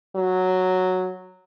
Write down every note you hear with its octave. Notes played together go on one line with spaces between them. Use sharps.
F#3